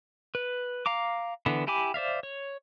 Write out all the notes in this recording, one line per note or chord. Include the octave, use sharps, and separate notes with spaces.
B4
F5 A#5 D6
D3 E3 B3
E4 G4 G#5 B5 D6
C5 D5 E5 F5
C#5